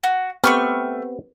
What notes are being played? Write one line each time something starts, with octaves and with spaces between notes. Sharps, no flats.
F#4
A3 B3 C4 G4 C#6 F6